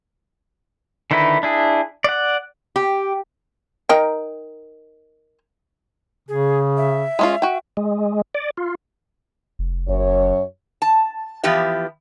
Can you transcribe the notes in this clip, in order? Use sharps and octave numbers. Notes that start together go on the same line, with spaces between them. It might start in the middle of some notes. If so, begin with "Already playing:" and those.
D3 D#3 D#4 E4 B4
D4 E4 G#4
D5 F#5
G4
D#4 A#4 G5
C#3 G#4
E5
G#3 C#4 F4
F#4 G5
G#3
D5
F4
F1
F#1 F#2 C#5
A5
E3 F3 B3 G4 E5